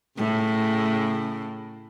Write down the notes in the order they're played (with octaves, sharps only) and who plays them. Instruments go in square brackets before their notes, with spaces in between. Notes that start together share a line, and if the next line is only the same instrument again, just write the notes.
[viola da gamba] A2 C#3